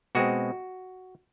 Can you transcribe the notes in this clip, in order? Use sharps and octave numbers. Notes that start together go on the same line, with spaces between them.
B2 G#3 C4 F#4